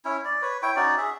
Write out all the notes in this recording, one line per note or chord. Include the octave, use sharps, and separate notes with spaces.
C#4 E4
D5
B4 C#5
E4 C#5 G5
C#4 D#4 F#4 D5
G#4 E5